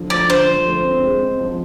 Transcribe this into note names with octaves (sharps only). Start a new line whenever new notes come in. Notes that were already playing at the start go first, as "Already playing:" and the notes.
Already playing: D3 F3
A3 D5
D3 C5
F3
A3
C4
G#3
C4
F3